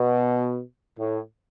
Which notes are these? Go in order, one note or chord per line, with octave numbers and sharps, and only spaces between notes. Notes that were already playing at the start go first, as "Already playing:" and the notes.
Already playing: B2
A2